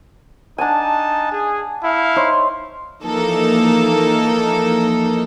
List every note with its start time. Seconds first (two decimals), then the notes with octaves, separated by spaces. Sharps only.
0.58 D4 D#4 F#5 G#5 A5
1.32 G#4
1.84 E4 F5
2.16 D#4 C5 C#5
3.02 E3 F3 A#3 D#4 A4